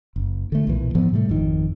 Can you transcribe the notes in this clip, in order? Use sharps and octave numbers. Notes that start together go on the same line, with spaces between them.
F#1
D3 A3
B1 A#2 E3
G#2 E3 F3 B3
A2 C3 G3 A3
G#1 F2 D#3